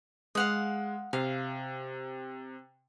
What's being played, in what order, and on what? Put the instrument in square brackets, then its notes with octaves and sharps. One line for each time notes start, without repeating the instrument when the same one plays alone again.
[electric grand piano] G#3 [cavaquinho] F5 F#5 D#6
[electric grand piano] C3 [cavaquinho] F5